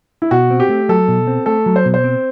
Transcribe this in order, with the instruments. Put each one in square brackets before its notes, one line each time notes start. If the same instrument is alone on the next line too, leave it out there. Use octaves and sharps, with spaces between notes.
[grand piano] E4
[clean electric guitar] B2 [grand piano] F#4
[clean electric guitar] C4
[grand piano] G4
[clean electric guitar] A3
[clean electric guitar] F#3 [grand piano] A4
[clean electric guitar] B2
C4
[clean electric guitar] A3 [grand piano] A4
[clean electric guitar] F#3
[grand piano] C5
[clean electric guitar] B2
[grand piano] C5
[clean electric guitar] C4